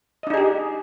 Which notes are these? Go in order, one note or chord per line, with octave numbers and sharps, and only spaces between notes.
D4 D#4 G4 G#4 D#5